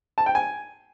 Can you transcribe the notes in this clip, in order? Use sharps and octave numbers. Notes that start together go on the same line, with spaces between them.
A5
G5
G#5